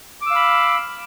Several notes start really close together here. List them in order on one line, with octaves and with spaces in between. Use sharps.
D6 E6 F5 B5